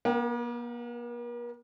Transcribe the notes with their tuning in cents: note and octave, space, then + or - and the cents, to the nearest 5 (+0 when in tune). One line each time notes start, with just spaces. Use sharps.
A#3 +45 A#4 +0 G5 -15